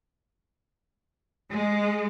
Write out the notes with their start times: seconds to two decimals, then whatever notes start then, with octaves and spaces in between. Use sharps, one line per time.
1.52 G#3